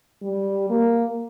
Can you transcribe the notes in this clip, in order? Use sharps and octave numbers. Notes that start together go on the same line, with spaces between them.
G3
A#3